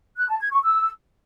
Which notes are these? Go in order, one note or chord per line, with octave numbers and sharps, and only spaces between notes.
F#6
A5
G#6
C#6
E6